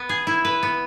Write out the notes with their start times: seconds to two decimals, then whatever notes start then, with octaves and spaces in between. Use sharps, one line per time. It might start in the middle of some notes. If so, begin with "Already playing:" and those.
Already playing: B3 B4
0.09 G#4
0.27 E4
0.45 B4
0.63 B3